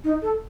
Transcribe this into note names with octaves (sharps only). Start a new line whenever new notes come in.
D#4
A4